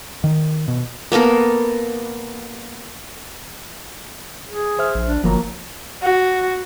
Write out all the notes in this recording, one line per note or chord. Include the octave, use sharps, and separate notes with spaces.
D#3
B2
A#3 B3 A4 A#4
G#4
C5 E5 F6
A#1
D4
G1 F3 F#3 A#3 A#5
F#4